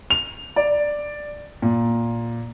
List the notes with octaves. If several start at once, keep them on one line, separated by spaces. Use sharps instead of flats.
F7
D5
A#2